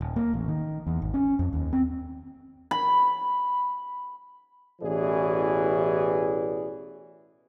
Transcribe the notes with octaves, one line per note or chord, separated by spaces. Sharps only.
D#1
A#3
A1
D#3
E2
G#1
C#4
F2
D#2
C4
B5
A1 B2 E3 G#4 D5